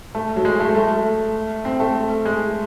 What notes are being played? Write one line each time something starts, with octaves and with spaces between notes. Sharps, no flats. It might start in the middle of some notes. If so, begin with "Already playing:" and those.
A3
F#3
G#3
A3
A3
C4
A3
G#3